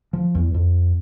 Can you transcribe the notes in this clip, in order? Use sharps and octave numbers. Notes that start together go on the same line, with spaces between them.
F3
E2
F2